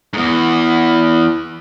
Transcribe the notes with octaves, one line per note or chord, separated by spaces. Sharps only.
E2 G#2